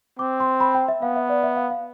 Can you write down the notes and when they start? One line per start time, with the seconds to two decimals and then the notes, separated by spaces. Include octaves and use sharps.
0.19 C4 D6
0.40 C6
0.60 B5
0.75 G5
0.88 E5
1.02 B3 F5
1.16 E5
1.29 D5
1.43 E5
1.56 F5
1.70 F5